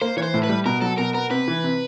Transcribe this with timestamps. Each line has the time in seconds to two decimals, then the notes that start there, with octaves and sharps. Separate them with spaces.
0.02 A#3 C5
0.17 E3 C#5
0.23 C5
0.34 A2
0.44 B4
0.49 G3
0.65 B2 A#4
0.82 F#3 A4
0.98 B2 A#4
1.14 B3 A#4
1.31 C3 B4
1.48 E3
1.64 C3